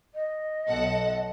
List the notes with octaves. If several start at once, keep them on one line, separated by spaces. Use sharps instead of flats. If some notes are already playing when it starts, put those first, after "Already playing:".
D#5
B1 A4 F#5